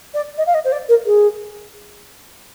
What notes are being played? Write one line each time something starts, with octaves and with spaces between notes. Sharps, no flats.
D5
D#5
F5
D#5
C5
D5
A#4
G#4